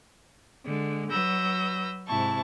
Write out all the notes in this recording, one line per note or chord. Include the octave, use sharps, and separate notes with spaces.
D3 G#3
F#3 B4 E6 G6 A#6
G#2 C3 E4 A5 C#6